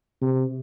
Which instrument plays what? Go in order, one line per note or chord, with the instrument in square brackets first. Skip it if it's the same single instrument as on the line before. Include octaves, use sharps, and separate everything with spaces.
[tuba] C3